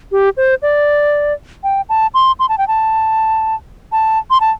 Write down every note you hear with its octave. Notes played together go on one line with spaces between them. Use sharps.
G4
C5
D5
G5
A5
C6
C6
A5
G5
A5
A5
C6
A5